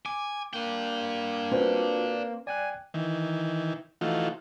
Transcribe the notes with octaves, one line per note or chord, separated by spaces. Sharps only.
G#5 D6
A#3 D4 G5
C4 F4 F#4 B4 D5
D5 G5 G#5 F#6
D#3 E3
E3 F3 A3 D#4 F4 F#4